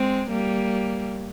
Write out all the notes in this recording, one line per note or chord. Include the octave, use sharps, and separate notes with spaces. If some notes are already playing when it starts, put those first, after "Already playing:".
Already playing: G#3 C4
G3 A#3